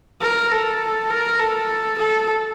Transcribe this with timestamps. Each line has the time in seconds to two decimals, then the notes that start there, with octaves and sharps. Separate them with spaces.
0.22 A#4
0.52 A4
1.11 A#4
1.40 A4
1.99 A4